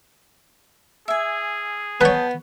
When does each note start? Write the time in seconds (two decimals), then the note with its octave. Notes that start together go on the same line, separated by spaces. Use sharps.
1.08 G#4 E5 G#5
2.01 B3 B4 C#5 G5 A5